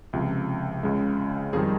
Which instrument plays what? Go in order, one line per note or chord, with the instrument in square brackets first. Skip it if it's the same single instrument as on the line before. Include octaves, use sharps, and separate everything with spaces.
[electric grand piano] C#2 C3 F3
C#2 C#3 G#3
F2 D#3 G3 F4 G#4